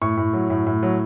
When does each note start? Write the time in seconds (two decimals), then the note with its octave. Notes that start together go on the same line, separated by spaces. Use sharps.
0.02 A2 C#6
0.17 A2
0.33 F#3
0.50 A2
0.66 A2
0.83 F#3